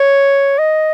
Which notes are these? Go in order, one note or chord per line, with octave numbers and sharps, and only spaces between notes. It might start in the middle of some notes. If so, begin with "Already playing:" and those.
Already playing: C#5
D#5